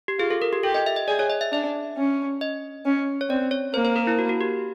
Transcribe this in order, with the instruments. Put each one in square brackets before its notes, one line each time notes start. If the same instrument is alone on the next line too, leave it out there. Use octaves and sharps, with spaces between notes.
[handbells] G4
[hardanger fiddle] F4 [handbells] G#4
[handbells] A4
A#4
G4
[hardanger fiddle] G4 [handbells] A4
[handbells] D#5
E5
D#5
[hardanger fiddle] G#4 [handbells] D5
[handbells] C#5
D#5
E5
[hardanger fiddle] D4 [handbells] E5
[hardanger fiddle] C#4
[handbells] D#5
[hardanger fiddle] C#4
[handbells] C#5
[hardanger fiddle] C4 [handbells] D5
[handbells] C#5
[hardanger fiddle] A#3 [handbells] C5
[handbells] C5
A#4
E4
F#4
F#4
G4